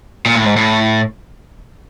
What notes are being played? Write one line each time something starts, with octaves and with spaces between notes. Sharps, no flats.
A#2
A2
G#2
A2